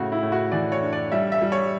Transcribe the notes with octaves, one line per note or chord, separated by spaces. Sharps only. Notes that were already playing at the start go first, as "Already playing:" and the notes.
Already playing: A2 C#3 F#4
E4
A2
F#4
E3 D5
C#5
D4
D5
G3 E5
E5
G3
C#5